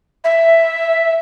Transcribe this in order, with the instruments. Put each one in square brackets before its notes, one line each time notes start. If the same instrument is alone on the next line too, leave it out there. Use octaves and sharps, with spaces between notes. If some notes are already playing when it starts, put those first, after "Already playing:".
[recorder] E5